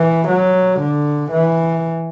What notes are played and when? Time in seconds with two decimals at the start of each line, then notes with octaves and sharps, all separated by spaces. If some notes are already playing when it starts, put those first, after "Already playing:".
Already playing: E3
0.28 F#3
0.80 D3
1.31 E3